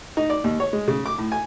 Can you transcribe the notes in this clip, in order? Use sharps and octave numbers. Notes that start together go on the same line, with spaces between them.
D#4
D5
D#2
C#5
G#3
C#3
D6
A2
G#5